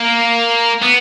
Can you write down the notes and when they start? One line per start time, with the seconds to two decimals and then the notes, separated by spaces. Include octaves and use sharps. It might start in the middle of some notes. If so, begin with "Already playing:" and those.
Already playing: A#3
0.82 B3